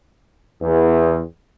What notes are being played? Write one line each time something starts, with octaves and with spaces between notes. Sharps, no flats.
E2